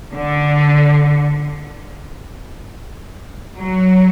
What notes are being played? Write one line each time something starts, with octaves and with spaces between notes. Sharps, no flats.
D3
F#3